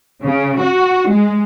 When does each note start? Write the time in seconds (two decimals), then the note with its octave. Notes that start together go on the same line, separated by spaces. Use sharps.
0.23 C#3
0.58 F#4
1.09 G#3